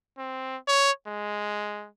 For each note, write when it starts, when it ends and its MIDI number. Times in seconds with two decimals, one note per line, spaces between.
0.18 0.57 60
0.67 0.91 73
1.07 1.88 56